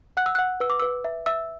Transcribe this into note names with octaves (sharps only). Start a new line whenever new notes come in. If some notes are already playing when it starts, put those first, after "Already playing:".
F#5 F#6
E6
F#5 F#6
B4 E6
D6
B4 E6
E5
E5 E6